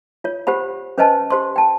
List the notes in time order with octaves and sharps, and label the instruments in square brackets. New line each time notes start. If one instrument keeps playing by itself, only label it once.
[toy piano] F4 C#5
G4 C5 F#5 B5
C#4 B4 C5 D#5 G#5 A5
G4 C5 C6
G5 A5